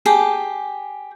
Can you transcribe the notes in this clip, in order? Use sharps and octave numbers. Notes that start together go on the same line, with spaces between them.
G4 G#4 A5